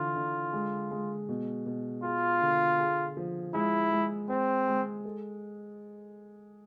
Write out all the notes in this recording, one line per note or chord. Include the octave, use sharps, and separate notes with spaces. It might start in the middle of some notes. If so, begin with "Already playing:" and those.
Already playing: D3 E3 F4
D3
G#3
G#3
B2
B2
F4 G#4
D3
G#4
F3
G#3 E4
G#3
C4 C5
G#3
A4